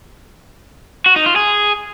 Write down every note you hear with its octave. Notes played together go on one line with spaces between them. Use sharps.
F#4
D#4
F4
G#4